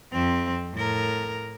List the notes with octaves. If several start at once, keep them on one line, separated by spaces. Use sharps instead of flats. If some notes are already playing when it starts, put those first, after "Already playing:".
F2 C4
A2 A#4